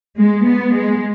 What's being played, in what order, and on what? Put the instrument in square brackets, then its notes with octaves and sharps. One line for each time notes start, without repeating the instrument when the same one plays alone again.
[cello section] G#3
B3
G#3